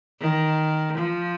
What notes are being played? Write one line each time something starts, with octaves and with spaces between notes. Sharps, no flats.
D#3
F3